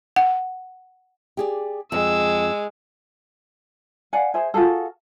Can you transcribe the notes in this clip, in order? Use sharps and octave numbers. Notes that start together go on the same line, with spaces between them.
F#5
G4 G#4 D5
F2 G#3 E6
D5 F5 F#5 G#5
G#4 C5 E5 G#5
F4 F#4 G#4 A4